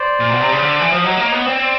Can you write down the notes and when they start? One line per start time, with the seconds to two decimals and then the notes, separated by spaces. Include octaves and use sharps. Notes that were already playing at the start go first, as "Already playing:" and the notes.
Already playing: C5 D5
0.20 A#2
0.31 B2
0.41 C3
0.51 C#3
0.62 D3
0.80 E3
0.91 F3
1.04 F#3 C#5 D#5
1.18 A#3
1.25 C#5 D#5
1.32 B3
1.46 C4 D5
1.54 C#5
1.62 C5 D5